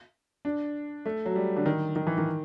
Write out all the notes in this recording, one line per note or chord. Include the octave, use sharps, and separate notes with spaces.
D4
A3
F#3
G3
D3
D#3
D#3
E3
D#3